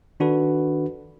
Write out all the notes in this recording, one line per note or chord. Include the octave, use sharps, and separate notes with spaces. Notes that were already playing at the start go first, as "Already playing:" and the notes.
D#3 D4 F#4 A4 B4